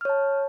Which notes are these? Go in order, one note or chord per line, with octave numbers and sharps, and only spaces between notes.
C#5 A5 F6